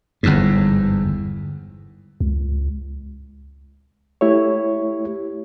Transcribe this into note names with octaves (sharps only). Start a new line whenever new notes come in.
G1 E2 G#2
C#2
A3 E4 G4 C#5